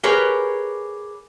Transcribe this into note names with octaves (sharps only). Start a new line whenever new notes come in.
G4 G#4 A#4 B4 C#5